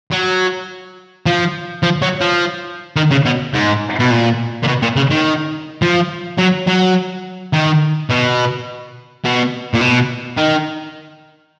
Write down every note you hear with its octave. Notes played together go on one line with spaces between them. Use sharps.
F#3
F3
F3
F#3
F3
D#3
C#3
B2
G#2
B2
A#2
A#2
B2
A#2
C#3
D#3
F3
F#3
F#3
D#3
B2
B2
A#2
B2
D#3